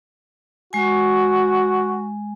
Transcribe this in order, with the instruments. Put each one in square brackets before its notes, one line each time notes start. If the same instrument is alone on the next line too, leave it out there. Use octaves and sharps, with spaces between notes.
[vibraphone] G#3 G#5 [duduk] F#4